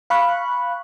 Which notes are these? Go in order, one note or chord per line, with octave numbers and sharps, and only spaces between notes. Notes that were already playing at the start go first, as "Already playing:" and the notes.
F5 B5 C#6 F#6